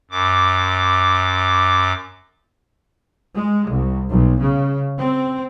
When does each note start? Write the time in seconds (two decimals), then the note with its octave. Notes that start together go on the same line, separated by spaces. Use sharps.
0.11 F#2 D6
3.35 G#3
3.69 C2
4.11 B1
4.41 C#3
4.98 C4